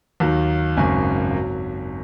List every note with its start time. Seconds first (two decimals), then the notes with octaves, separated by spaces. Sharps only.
0.20 D#2 D#3 F#3
0.77 G#1 F#2 C#3 G#5
1.34 F#3